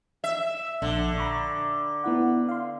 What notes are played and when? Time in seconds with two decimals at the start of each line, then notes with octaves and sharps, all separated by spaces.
0.24 E5
0.82 A#1 D3
1.18 A#5 B5 C#6
2.04 B3 E4 F#5
2.49 F5 C6